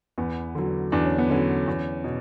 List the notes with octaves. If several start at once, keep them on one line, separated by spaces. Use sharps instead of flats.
E2 B3
D3 F#3
E2 D4
C#4
B3
D3 F#3 C#4
E2
B2